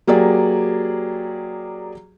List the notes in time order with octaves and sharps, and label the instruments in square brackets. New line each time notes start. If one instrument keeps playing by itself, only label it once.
[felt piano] F#3 A#3 G4 G#4 D5